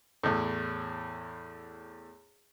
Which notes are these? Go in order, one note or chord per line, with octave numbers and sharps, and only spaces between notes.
E2 A2